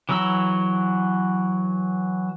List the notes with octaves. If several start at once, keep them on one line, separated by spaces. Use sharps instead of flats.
E3 F#3 A#5 E6